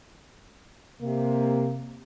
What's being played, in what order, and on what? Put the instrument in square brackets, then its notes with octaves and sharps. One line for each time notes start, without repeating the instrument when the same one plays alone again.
[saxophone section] C3 [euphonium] A#3